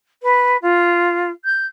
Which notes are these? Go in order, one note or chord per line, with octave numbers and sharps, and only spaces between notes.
B4
F4
G6